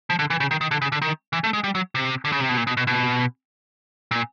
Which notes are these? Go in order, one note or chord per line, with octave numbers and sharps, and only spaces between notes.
F3
D3
E3
C#3
D#3
D#3
D3
C#3
D3
D#3
E3
A3
G#3
G3
F#3
C3
D3
C#3
C3
B2
A#2
B2
B2
B2
A#2